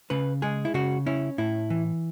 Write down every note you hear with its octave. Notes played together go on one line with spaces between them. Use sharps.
C#3 B4
G#3 G#4
E4
C#3 F#4
C#4 E4
A2 E4
E3